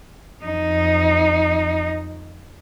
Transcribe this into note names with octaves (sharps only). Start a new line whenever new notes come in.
F2 D#4